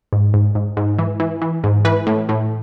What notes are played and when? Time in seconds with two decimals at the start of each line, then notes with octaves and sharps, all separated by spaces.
0.13 G#2
0.34 G#2
0.55 G#2
0.77 G#2
0.99 E3
1.20 E3
1.42 E3
1.64 G#2
1.85 E3 B4
2.07 A2
2.29 A2